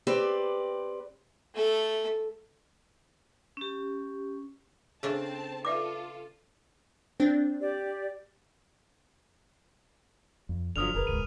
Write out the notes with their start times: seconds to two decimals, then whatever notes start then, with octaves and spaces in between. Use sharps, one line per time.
0.07 C4 G4 B4 D5
1.54 A3 A4
3.57 C#4 G4
5.03 C#3 A3 C4 D4 G#4 A5
5.65 F4 A4 B4 D5 E5 D6
7.20 C4 D4
7.60 G4 D5
10.49 F2
10.76 G1 D3 F3 F#3 D#6 F6 F7
10.94 F1 C#2 G#4 A#4 B4
11.07 D#1 C#2 G#2 D#7